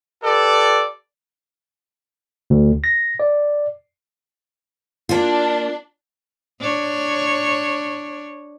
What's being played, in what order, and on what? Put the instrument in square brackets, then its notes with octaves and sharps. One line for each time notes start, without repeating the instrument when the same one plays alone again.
[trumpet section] G4 A4 B4 D5
[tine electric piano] D2
A#6
D5
[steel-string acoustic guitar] A#3 F4 [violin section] D4
[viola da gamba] D4 C#5